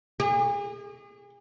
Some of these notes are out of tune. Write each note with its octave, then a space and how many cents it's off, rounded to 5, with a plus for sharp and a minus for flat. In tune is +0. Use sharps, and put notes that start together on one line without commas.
G#4 -40